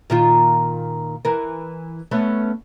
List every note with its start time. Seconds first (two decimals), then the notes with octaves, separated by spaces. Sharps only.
0.10 A#2 D#3 F4
1.25 E3 A#4
2.11 A3 B3 C#4